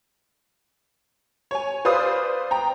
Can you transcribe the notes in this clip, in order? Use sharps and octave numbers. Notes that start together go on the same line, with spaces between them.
C#5 G#5
B4 C5 D5 F5 D#6
G5 A#5